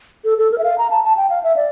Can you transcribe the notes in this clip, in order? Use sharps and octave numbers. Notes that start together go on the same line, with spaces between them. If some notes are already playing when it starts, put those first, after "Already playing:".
A4
A4
A#4
E5
F5
A#5
A5
A5
G5
F5
E5
D5